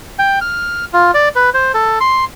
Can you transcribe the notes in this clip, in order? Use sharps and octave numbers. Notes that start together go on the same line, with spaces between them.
G5
F6
F4
D5
B4
C5
A4
C6